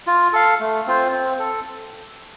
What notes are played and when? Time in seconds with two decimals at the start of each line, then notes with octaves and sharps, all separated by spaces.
0.07 F4
0.33 A4 F5
0.60 A3
0.87 C4 F4 C5
1.12 C4
1.39 A4